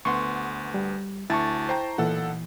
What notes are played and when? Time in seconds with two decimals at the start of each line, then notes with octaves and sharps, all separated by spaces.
0.05 D2 B3 F#5 C6 C#6
0.74 G3
1.30 D2 E4 A5 C#6 A6
1.69 C5 G5 A#5
1.98 B1 A#2 E3 A4 F#5